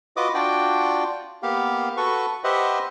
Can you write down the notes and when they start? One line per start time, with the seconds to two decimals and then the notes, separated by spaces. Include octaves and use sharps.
0.17 F4 F#4 B4 D#5 D6 D#6
0.34 D4 F4 F#4 D5 G5
1.43 A#3 B3 G4 F5
1.97 F#4 A4 B4 C#6
2.44 G4 B4 C5 D#5 E5 F#5